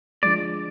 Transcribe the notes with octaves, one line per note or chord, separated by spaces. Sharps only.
D3 F3 G#3 D5